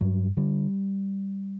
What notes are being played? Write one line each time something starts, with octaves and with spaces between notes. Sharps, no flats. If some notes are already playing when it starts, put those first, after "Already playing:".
G2 F#3
D3 G3